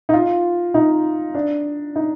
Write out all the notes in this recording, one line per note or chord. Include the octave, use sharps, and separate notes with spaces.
D#4
F4
D#4
D4
D#4